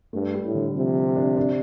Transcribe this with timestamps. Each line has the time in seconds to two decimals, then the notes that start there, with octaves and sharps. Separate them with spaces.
0.13 G2 A3
0.34 G3
0.44 A2
0.54 D3
0.75 C3 F3
1.16 D4
1.37 D4